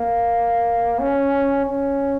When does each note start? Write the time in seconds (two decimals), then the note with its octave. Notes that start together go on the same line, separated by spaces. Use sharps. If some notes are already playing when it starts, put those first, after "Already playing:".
Already playing: A#3
0.99 C#4
1.65 C#4